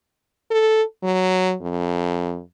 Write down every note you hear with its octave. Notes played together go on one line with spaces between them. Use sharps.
A4
F#3
F2